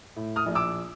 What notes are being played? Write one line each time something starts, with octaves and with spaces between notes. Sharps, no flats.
A2
D#6 F6
A#1
D6 E6